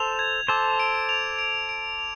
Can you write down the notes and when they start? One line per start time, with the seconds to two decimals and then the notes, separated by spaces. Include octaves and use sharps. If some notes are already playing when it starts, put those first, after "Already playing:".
Already playing: A4 C5 F7
0.19 G#6
0.48 A4 C5 D6
0.80 D7
1.09 F7
1.39 D7
1.69 D7
1.99 F7